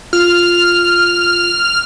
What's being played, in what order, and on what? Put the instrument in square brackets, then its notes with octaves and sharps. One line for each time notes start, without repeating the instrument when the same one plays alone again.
[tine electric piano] F4 [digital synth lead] F6